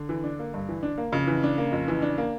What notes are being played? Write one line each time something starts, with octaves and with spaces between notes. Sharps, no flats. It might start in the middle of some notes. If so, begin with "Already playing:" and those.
Already playing: D3
E3
D4
A#3
G2
E3
D4
A#3
F2 C#3
E3
D4
A#3
F2
E3
D4
A#3